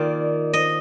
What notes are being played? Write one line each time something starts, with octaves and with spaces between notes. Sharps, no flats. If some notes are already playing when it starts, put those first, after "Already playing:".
Already playing: D#3 A#3 F4 D5
D#5